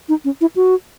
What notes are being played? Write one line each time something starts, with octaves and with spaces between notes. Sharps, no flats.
D#4
C#4
E4
F#4